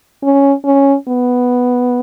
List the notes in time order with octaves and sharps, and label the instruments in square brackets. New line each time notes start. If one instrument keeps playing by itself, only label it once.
[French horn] C#4
C#4
B3